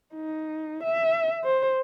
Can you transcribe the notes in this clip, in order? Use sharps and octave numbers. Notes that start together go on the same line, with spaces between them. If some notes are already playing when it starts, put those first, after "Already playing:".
D#4
E5
C5